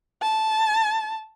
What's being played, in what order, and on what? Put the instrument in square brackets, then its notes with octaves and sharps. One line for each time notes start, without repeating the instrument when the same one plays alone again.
[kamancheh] A5